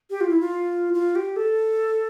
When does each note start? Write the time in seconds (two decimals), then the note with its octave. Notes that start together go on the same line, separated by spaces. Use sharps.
0.10 G4
0.20 F4
0.29 E4
0.40 F4
0.94 F4
1.15 G4
1.36 A4